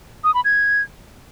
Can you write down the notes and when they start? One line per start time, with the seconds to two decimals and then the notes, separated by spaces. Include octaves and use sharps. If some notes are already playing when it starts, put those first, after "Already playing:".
0.24 D#6
0.34 B5
0.45 G#6